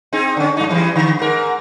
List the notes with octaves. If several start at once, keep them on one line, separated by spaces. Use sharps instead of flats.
C4 D#4 G#4
D3 C#4
G2 D#4
C#3 E3 G3
D3
G#2 A#4